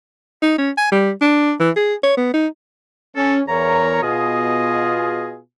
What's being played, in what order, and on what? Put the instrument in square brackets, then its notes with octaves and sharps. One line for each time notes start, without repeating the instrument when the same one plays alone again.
[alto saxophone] D#4
C#4
G#5
G3
D4
E3
G#4
C#5
B3
D#4
[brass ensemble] C#4 [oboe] A4
[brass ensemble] E2 A#4 C#5 [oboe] A#5
[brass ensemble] B2 F4 G#4 [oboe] D#5